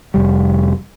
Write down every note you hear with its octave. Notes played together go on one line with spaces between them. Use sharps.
F1 G3